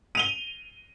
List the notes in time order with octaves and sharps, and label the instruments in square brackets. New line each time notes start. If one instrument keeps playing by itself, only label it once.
[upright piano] D#7 F7 G7